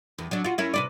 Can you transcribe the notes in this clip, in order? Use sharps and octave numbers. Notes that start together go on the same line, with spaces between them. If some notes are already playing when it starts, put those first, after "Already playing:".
E2
F#3 D4
F4 F#4
C#4 E4 A#4
C3 B4 D5